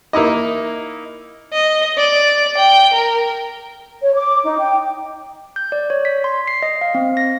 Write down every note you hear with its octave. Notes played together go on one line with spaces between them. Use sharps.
A#3 D#4 E4 D#5
D#5
D5
G5
A#4
C#5
D6
D#4
G5
G6
D5
C#5
B6
C6
C7
D#5
F5
C4
A#6